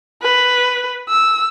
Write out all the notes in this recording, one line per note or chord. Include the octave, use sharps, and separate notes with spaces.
B4
E6